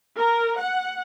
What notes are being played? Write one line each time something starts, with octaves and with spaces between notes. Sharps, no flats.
A#4
F#5